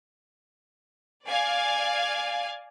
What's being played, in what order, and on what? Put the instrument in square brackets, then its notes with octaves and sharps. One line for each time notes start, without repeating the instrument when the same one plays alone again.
[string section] D5 F5 G#5